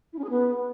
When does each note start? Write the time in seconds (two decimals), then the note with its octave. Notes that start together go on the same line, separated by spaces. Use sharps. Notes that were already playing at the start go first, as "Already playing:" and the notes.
0.12 E4
0.18 C#4
0.23 G#4
0.29 B3